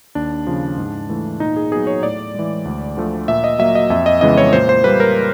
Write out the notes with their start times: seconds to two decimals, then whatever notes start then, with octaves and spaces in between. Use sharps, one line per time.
0.15 D#2 D4
0.47 C#3 F3
0.78 G#2
1.09 E3 A3
1.40 A#2 D#4
1.56 G#4
1.72 F#3 B3 G#4
1.87 C#5
2.03 A2 D5
2.35 E3 G#3
2.65 D2
2.97 D3 F3 A3
3.28 A#2 E5
3.44 D#5
3.59 F#3 A#3 E5
3.75 D#5
3.90 F2 E5
4.06 D#5
4.21 C#3 E3 G#3 B3 D#5
4.37 C#5
4.53 A#2 C5
4.69 C5
4.84 G3 A#3 B4
5.00 A#4